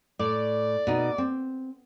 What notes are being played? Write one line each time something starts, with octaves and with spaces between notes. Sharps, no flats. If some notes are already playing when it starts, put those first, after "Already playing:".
A2 D5
B2 D#4
C4